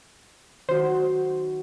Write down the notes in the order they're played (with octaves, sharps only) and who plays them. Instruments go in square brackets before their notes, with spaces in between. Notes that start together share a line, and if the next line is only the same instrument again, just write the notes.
[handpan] D#3 F#4 [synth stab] C5